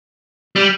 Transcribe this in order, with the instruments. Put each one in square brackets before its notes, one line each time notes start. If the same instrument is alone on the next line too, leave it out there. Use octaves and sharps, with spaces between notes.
[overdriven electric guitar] G3